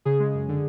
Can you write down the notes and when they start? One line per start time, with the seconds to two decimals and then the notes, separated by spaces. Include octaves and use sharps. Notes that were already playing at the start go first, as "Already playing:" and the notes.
0.05 C#3 G#4
0.20 G#3
0.34 F#2
0.49 D3